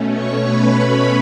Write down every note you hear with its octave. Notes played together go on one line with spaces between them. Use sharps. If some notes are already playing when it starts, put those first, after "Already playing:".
Already playing: B2 A3 C#4
C#5 C#6
B4 B5